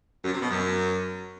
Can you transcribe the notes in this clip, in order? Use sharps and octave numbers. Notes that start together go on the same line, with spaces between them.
F#2
C3
B2
F#2